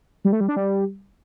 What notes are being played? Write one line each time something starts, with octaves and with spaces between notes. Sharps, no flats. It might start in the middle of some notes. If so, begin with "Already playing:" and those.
G3
A3
G3
D4
G3